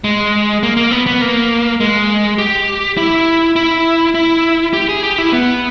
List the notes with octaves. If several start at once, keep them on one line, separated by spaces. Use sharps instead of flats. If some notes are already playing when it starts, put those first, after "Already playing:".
G#3
A#3
A#3
B3
B3
A#3
G#3
G4
E4
E4
E4
G4
G#4
G4
E4
B3